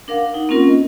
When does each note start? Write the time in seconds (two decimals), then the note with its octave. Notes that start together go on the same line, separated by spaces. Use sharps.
0.08 D4 A#4 F5 F#5
0.34 D#4 F#5
0.49 A#3 C4 C#4 F4 A#4
0.68 D#5